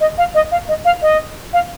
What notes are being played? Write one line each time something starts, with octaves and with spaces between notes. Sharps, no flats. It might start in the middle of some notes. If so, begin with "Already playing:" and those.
D#5
F5
D#5
F5
D#5
F5
D#5
F5